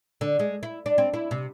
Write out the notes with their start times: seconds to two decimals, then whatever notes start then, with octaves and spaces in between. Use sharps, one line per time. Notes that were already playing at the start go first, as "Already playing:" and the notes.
0.21 D3
0.39 G#3
0.63 E4
0.86 D4
0.98 C4
1.14 E4
1.31 C3